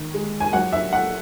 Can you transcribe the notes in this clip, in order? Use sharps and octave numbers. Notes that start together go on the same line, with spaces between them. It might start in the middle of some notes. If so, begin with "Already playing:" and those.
Already playing: D#3
G#3
G#5
F#3 F#5
E5
A3 F#5